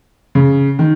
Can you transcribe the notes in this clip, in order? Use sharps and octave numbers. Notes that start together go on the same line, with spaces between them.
C#3
D#3